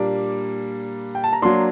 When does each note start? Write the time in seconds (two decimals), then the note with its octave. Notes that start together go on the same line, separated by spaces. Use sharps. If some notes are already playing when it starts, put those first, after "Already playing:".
Already playing: A#2 G3 A#3 D4 D6
1.15 G5
1.24 A5
1.33 A#5
1.42 F#3 A#3 D4 C6